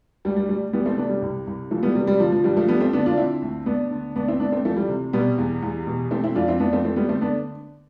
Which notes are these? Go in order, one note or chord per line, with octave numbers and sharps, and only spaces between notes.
D2 G3
G3
D2 G3
E3 G3 B3
A3 C4
C3 B3 D4
G3
C2
C2
E3 F3 A3
G3 B3
C3 G3
G3
D3 F3
F3
G2 G3
F3 A3
G2 G3 B3
A3 C4
D3 B3 D4
D4 F4
D3 C4 E4
D2
D2 B3 D4
D3
D2 B3 D4
C4 E4
D2 B3 D4
A3 C4
E3 F3 A3
G3
C3
B2 G3 B3
E2
E2
B2
E3 A3 C4
C4 E4
F2 D4 F4
C4 E4
F2 B3 D4
A3 C4
E3 A3 C4
G3 B3
D3 A3 C4
B3 D4